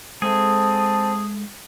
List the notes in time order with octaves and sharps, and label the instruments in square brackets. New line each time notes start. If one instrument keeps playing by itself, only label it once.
[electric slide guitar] G#3 A4 E5 [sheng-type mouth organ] C4 [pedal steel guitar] G#4 [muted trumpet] A5